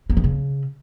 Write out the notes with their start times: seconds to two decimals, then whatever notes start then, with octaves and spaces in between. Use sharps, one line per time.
0.10 A#3
0.17 D#3
0.24 C#3